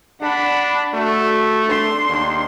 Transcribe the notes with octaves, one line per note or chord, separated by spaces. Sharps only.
D4 F#5 B5
A3 F#4
D4 C6
D#2